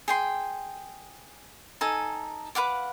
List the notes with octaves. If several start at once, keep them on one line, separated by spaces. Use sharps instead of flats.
G#4 G5 C6
D#4 A4 G#5
B4 F5 F#5 D6